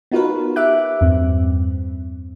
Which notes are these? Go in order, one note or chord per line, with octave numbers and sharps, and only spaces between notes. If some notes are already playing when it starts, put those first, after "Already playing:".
B3 D#4 F4 F#4 A#4 B4
G4 E5 D6 F#6
E2 G2 C4